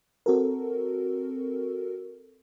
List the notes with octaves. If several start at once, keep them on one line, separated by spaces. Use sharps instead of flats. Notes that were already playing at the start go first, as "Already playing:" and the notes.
C4 F#4 A4 A#4